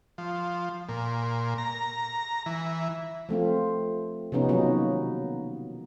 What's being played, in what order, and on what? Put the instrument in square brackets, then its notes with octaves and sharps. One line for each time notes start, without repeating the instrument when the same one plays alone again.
[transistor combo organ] F3
A#2
A#5
E3
[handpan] F3 A3 C4 F4
C3 F3 B3 C#4 D#4
B2 D#3 F#3 A#3 C#4 D#4